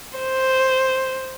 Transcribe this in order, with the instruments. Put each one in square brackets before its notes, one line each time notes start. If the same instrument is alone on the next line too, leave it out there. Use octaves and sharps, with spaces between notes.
[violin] C5